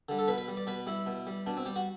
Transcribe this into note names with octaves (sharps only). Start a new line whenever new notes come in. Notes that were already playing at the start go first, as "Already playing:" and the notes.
D3 G3
A4
B2 B4
B4
G3
D5
B2 B4
G3 E4
B2
G3
B2 D4
C4
G3 G4
F#4